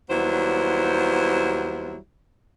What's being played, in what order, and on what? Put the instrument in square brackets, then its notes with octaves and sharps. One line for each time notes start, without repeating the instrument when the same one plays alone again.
[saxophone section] D#2 F#3 G3 B3 E4 C5